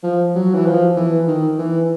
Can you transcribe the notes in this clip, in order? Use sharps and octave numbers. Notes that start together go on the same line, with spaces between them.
F3
F#3
E3
F3
E3
D#3
E3